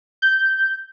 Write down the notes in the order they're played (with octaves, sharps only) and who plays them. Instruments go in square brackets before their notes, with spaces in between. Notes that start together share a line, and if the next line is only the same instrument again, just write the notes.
[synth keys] G6